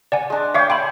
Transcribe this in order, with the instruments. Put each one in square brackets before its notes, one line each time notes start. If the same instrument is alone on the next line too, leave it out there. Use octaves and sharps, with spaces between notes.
[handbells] D5 F#5 G#5
[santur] G#3 D4
[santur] C#5 G5 [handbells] E5 F5 D6
[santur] E5 G#5 C6 [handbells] G5 B5